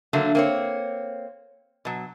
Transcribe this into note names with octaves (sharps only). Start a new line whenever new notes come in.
D3 F#3 A3 A#3
A#3 C4 C#5
B2 F#3